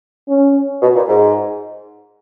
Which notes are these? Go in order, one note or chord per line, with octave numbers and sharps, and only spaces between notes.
C#4
B2
A#2
G#2